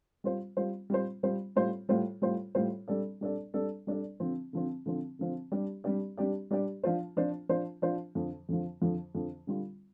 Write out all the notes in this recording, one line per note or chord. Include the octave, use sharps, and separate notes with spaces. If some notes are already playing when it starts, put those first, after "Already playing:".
G3 F4 C5
G3 F4 C5
G3 F4 C5
G3 F4 C5
A2 G3 F4 C5
A2 G3 F4 C5
A2 G3 F4 C5
A2 G3 F4 C5
G3 D4 A4 D5
G3 D4 A4 D5
G3 D4 A4 D5
G3 D4 A4 D5
D3 F3 C4
D3 F3 C4
D3 F3 C4
D3 F3 C4
G3 D4 G4 D5
G3 D4 G4 D5
G3 D4 G4 D5
G3 D4 G4 D5
F3 D4 F4 C5
F3 D4 F4 C5
F3 D4 F4 C5
F3 D4 F4 C5
F2 D3 F3
F2 D3 F3
F2 D3 F3
F2 D3 F3
D3 G3 F4